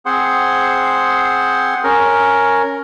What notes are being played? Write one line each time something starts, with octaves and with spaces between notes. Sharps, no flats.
C4 G#4 C5 F#5 C6
C#4 A#4